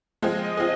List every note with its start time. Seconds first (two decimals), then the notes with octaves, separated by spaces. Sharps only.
0.22 F3 G#3 C4 F4 G#4 D#5
0.57 C4 F4 G#4